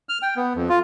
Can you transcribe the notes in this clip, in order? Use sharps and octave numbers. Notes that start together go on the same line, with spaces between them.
F6
G5
B3
F2
F4